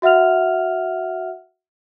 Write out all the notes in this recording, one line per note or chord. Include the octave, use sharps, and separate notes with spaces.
F#4 E5 F#5 F6 F7